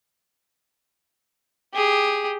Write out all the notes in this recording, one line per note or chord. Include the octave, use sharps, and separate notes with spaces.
G4 G#4